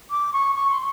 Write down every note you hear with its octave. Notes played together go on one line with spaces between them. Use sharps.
D6
C#6
C#6
C6